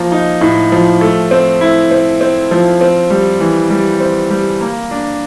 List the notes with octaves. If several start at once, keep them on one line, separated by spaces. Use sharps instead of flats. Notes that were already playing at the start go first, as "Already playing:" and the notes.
Already playing: F3 A#3
D#4
A2
F3
A3
C4
E4
C4
C4
F3
C4
G3
E3
G3
C4
G3
A#3
D4